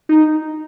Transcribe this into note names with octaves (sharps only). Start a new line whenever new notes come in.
D#4